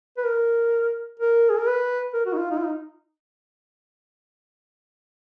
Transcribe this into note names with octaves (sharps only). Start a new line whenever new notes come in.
B4
A#4
A#4
G#4
A#4
B4
A#4
F#4
D#4
F4
D#4
F4
D#4